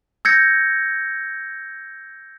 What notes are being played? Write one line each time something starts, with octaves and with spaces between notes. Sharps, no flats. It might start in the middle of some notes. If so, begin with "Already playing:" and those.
E6 G6 G#6 A#6 C#7